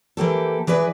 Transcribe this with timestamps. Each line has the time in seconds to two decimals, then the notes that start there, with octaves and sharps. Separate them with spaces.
0.17 E3 A#3 G4 A4
0.67 E3 G#4 B4 D5